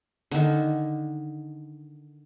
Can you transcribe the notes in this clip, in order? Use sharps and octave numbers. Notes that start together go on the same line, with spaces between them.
D3 D#3